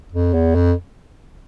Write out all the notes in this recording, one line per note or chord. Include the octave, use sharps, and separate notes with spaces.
F2
E2
F2